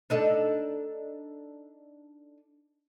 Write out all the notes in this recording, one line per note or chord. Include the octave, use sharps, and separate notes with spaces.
D4 D#4 A4